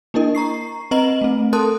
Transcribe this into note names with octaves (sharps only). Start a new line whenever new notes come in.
A#3 D4 E4 A#4 D#5
A#5 C#6 C7
C4 B4 D#5 A#5 F#7
A3 C4
A4 A#4 A5 C6 D#6 F#6